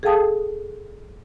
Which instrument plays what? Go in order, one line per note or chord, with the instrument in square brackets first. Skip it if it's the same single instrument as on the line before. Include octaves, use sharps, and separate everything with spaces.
[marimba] G#4 A4 F5 G5 A5 D#6